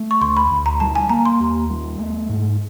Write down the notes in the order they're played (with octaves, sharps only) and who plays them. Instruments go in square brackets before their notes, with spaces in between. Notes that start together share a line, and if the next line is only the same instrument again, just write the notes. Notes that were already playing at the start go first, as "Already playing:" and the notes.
Already playing: [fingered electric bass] A3
[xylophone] C#6
[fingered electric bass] D2 [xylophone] C6
[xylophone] B5
[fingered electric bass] D2
[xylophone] A#5
[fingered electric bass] G3 [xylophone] A5
[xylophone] G#5
[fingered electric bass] A#3 [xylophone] A#5
[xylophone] C6
[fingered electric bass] D#2
G3
A3
G#2